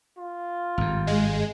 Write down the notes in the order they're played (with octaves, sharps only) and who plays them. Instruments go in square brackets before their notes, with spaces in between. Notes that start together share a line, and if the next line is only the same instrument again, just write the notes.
[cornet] F4
[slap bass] G#1 G2
[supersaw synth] G#3